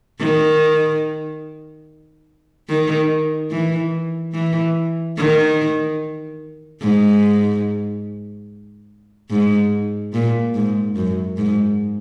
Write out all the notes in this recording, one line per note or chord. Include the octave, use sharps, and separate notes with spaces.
D#3
D#3
E3
E3
D#3
G#2
G#2
A#2
G#2
F#2
G#2